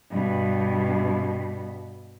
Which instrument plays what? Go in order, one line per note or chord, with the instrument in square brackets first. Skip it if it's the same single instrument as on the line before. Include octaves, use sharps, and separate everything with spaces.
[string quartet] G2 B2